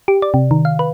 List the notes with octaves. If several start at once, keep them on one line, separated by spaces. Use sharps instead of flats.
G4
D5
C3
D#3
F5
B4